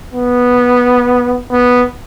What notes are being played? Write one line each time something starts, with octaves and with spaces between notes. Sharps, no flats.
B3
B3